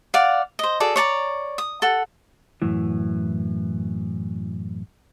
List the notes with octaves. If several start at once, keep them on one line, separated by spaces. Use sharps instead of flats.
D5 F5 F#5
C5 D#5
F#4 G#4 A4 D5
C#5 D5 A5 A#5
D#6
A4 F#5
F#2 A2 E3